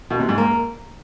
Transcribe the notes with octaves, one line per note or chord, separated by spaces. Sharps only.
B2
C3
G#2
A#3